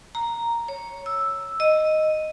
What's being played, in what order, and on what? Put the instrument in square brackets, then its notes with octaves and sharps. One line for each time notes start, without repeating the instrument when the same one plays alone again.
[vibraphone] A#5
C#5
E6
D#5